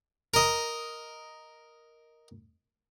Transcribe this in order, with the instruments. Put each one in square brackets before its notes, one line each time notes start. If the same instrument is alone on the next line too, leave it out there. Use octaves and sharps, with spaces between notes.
[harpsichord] A#4 D#5